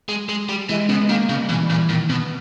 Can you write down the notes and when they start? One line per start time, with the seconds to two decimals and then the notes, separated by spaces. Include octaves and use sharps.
0.09 G#3
0.29 G#3
0.49 G3
0.69 E3 G#3
0.89 C#3 B3
1.01 G#3
1.09 D#3 A#3
1.29 C#3 G3
1.49 B2 E3
1.63 G3
1.70 A#2 E3
1.89 A#2 D#3
2.10 B2 B3